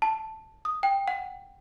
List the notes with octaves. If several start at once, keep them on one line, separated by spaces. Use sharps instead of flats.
A5
D#6
G5
F#5